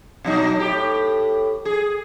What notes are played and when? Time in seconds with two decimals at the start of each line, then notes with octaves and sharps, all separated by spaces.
0.24 B2 F#3 D#4
0.55 A2 G4
1.65 G#4